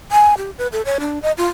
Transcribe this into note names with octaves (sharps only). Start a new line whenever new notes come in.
G#5
G4
B4
A4
C#5
D4
D#5
F4